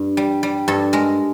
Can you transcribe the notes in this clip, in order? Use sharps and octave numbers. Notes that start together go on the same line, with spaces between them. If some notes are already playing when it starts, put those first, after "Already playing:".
Already playing: G2
G3
G3
G2 A4
G#3 A#4